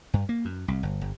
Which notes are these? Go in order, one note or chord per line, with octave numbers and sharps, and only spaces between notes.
G2
A#3
F#2
C2
G1
G1